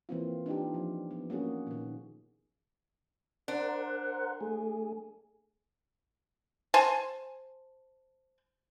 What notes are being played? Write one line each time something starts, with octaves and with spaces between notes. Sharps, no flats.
E3 A#3 C4 F4
D4 D#4 F4 G4
F3
B3
A#3 C#4 F#4 G#4
A#2 D#3
D4 A#4 C5 F#5
A3 G#4
C5 G#5 A5